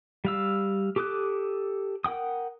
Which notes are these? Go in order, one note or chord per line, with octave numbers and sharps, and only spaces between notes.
G3 F5 E6
G4 A4 D6 D#6 F#6
A#4 F#5 G5 D#6